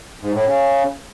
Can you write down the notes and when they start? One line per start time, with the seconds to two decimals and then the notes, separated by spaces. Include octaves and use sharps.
0.23 G#2
0.34 A2
0.46 C#3